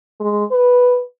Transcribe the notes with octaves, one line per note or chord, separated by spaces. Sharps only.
G#3
B4